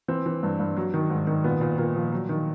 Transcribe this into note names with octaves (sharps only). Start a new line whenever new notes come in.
E3 C4
E3
G2
G2
F#3
D#3
G#2
D#3
A#2 B3
A#2
A#2 A#3
F3
F#3
D#3